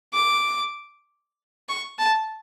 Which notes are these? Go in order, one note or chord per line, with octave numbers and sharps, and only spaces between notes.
D6
C#6
A5